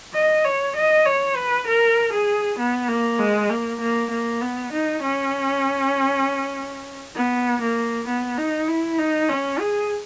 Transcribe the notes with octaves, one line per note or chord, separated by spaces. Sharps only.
D#5
C#5
D#5
C#5
B4
A#4
G#4
B3
A#3
G#3
A#3
A#3
A#3
B3
D#4
C#4
B3
A#3
B3
D#4
E4
D#4
C#4
G#4